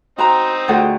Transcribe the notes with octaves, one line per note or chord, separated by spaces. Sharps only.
C4 D#4 F#4 C5 G5 A#5
D2 F4 G#4 A4 F#5 G5